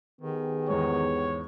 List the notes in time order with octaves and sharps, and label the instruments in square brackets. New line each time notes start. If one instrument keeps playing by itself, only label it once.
[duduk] D#3 [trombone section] B3 G4 G#4
[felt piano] E2 G#2 [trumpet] C#5